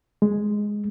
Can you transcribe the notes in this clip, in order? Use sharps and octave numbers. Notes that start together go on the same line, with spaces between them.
G#3